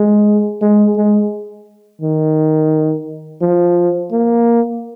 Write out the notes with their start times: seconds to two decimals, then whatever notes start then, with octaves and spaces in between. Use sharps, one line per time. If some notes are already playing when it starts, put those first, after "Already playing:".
Already playing: G#3
0.62 G#3
0.96 G#3
2.02 D#3
3.41 F3
4.12 A#3